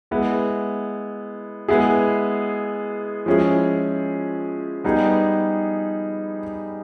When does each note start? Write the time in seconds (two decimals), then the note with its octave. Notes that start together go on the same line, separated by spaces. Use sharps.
0.11 G#3 B3 E4
1.68 G#3 B3 E4 G#4
3.26 F3 G#3 C#4 E4 G#4
4.84 G3 B3 D#4 G#4